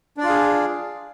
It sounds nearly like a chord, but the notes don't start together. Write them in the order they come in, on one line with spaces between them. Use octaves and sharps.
D4 D5 F4 F5 G#4